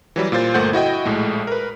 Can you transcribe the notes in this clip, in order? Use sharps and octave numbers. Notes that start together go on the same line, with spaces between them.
E3 F#3 G3
A#2 F4 C5 A6
G1 A3 A#3 C5 F#5 G6
E4 F#4 D#5 G5
A#1 A2 G#3 A3
A#4 B4